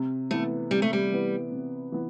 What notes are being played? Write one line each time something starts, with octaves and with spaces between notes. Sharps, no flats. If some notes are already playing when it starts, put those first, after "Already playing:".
Already playing: C3
E3 A3 B3
C3 G3
A3
G3
E3 B3
C3
E3 B3